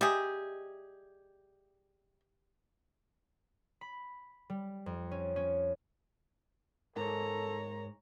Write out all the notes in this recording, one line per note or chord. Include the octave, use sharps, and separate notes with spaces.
G3 G4 G#4 D#5 E5
B5
G3
F2
C#4
C#4
G#2 A4 A#4 C#5 A#5